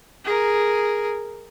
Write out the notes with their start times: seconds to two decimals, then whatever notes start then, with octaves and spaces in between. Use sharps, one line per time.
0.25 G#4 A#4